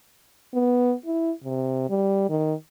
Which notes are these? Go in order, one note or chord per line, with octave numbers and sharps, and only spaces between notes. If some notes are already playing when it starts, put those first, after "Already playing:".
B3
E4
C3
G3
D#3